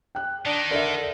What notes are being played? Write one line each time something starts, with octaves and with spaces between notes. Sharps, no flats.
G5 F#6
D#3 D4
D3 A#4 E5